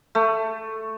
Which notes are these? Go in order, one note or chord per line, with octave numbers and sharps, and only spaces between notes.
A3